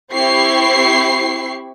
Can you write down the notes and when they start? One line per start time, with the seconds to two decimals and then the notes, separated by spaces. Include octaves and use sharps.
0.13 C4 E4 G4 C#6 C7